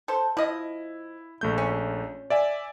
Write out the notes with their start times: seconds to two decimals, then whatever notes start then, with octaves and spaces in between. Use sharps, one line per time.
0.08 A4 C5
0.37 F3 E4 D#5
1.41 A#1 A3 G6
1.58 C#4
2.30 D5 E5 G#5